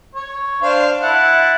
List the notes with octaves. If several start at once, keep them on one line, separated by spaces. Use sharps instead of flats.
C#5
D4 C5 F5
E4 F#5 A5